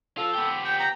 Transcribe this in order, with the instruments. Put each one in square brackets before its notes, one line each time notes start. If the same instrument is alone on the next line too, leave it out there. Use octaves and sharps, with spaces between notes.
[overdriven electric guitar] F3 F4 [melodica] A4
[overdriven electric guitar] B3 G4
[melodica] G5
G5 A#5